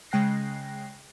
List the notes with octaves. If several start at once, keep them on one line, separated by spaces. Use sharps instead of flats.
C#3 G#3 G5 F#6 A#6 C7